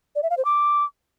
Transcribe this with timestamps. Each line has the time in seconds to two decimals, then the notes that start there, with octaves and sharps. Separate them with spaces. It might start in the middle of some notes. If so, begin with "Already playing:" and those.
0.16 D5
0.23 E5
0.30 F5
0.38 C5
0.45 D6